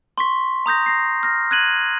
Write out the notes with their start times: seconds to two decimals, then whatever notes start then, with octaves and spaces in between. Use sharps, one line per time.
0.18 C6 C#6 B6
0.66 A#5 D#6 G6 A#6
0.86 A#6 C7
1.23 F6 A#6
1.51 F#6 G#6 D#7 F#7